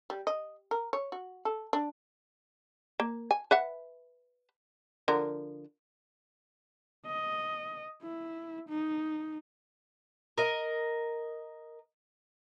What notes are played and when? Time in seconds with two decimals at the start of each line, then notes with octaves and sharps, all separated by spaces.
0.10 G3
0.27 D#5
0.71 A#4
0.93 C#5
1.12 F#4
1.45 A4
1.73 D4
3.00 A#3
3.31 G#5
3.51 B4 E5 F#5
5.08 D3 F3 A#4
7.06 D#5
8.02 E4
8.68 D#4
10.38 A#4 D#5